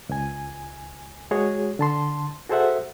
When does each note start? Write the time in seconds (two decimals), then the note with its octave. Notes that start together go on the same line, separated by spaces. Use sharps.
0.09 C#2 G#5
1.31 G#3 F#4 G#4 C#5
1.79 D3 A5 C6
2.49 F#4 G#4 A4 C5 E5 F#5